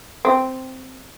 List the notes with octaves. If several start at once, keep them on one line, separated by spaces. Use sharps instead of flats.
C4